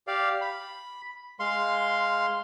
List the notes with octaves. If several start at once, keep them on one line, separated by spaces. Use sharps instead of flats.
G4 D5 F5
B5
G#3 F5 C6